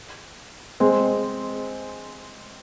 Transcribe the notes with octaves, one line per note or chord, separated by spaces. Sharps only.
G#3 C4